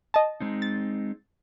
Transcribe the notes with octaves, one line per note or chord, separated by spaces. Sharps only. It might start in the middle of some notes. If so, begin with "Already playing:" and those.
D#5 A5
G#3 C4 D#4
A6